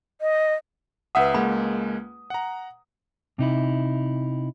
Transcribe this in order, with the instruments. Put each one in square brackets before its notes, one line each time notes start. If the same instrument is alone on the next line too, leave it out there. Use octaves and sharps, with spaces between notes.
[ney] D#5
[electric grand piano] C#2 E5 D#6 [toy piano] B4 F#5
[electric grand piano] C#2 G#3 A#3 [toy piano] B5
[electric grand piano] F#5 A#5
[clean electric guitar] C3 D#4 E4